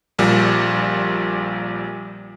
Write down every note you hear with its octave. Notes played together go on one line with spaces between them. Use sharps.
A#1 A#2 G3